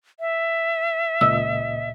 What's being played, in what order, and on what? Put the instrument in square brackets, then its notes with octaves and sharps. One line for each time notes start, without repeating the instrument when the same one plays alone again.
[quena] E5
[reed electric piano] C#2 A#2 D#5 [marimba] E6